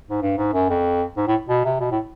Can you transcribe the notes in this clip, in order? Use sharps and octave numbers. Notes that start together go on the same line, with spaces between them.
G#2
G2
G#2
F#2
F2
G#2
A2
B2
C3
B2
A2